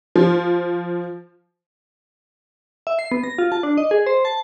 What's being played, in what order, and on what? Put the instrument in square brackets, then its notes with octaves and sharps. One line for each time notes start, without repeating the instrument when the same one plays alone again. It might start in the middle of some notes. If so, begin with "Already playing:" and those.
[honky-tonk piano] F3
[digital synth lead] E5
C7
B3
A#6
F4
A5
D4
D#5
G#4
C5
A5